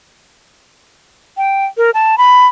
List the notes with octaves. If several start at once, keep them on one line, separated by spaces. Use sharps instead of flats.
G5
A#4
A5
B5